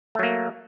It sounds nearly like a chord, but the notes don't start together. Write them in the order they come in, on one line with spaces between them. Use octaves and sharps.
A3 F#3 A#3